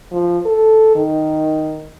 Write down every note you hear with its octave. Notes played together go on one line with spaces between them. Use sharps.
F3
A4
D#3